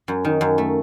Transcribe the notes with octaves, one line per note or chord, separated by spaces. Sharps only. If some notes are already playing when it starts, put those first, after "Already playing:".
F#2
D#3
F#2
A3